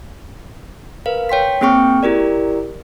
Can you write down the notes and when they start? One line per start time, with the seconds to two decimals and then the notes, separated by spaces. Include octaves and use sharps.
1.06 A#4 B4 F5
1.29 C#5 G5 C6 B6
1.61 A#3 C4 G#4 G5 C#6 F6
2.03 E4 G4 A#4 D5